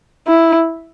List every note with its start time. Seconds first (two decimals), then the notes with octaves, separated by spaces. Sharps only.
0.27 E4